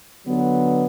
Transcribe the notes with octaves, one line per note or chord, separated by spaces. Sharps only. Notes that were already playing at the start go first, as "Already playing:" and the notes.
D3 F#3 B3